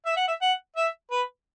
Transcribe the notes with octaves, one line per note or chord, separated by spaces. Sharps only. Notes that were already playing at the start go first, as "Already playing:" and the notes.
E5
F#5
E5
F#5
E5
B4